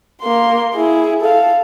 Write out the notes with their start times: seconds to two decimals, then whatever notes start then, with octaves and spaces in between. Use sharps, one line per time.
0.22 A#3 C6
0.75 E4 G#4
1.21 A4 F5